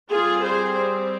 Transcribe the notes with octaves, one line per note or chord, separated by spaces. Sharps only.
G3 C4 F4 G#4
G#4 C5